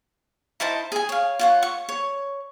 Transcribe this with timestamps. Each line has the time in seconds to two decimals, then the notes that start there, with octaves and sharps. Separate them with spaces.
0.60 D#4 E4 C5 A5
0.92 G#4 G#5
1.09 C#5 F5
1.39 F4 C#5 F#5
1.63 C#6
1.89 C#5